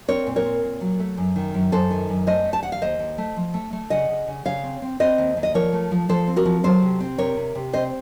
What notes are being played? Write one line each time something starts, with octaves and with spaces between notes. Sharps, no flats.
C4 A#4 C#5
A#2
A#4 C#5
C4
A#2
F#3
A3
F#2
D#3
F#2
F#2 A4 C5
D#3
F#2
A3 C5 D#5
A3
A5
D#2 F#5
F5
D#2 C5 D#5
D#2
A3
F3
A3
A3
C#3 D#5 F#5
C#3
C#3
C#3 C#5 F5
C4
C4
C4 C5 D#5
D#2
D#2
D#5
F3 A#4 C#5
A3
F3
F3 A4 C5
C4
F#4 A#4
F3
F#3 A4 C5
C3
C4
C3 A#4 C#5
C3
C3
C4 C5 D#5